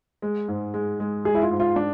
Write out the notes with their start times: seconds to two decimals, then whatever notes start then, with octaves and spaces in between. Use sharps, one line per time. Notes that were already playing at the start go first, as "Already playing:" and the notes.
0.22 G#3
0.48 G#2
0.74 G#3
1.00 G#3
1.25 G#3 G#4
1.35 E4
1.43 F4
1.51 G#2
1.60 F4
1.76 D4